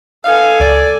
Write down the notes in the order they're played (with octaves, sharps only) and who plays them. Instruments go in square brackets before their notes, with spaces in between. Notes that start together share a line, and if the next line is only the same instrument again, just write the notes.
[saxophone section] B3 D#4 F5 [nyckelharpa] A4 G#5
[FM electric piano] C#2 [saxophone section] D5